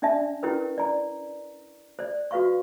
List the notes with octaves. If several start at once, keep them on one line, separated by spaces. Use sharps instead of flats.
C#4 D4 D5 E5 A5
C#4 E4 G4 A#4 B4
D5 A#5
C5 D5
F#4 B4 F5 C#6